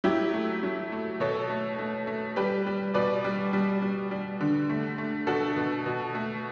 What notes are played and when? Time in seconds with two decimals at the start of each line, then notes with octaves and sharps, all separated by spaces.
0.04 F#3 E4 G4
0.33 A3
0.63 F#3
0.92 A3
1.20 B2 A4 C#5
1.50 A3
1.79 A3
2.07 A3
2.36 G3 G4 B4
2.66 G3
2.94 B2 B4 D5
3.24 G3
3.53 G3
3.82 G3
4.11 G3
4.41 D3
4.69 A3
4.98 A3
5.27 B2 F#4 A4
5.57 B2
5.86 B2
6.15 A3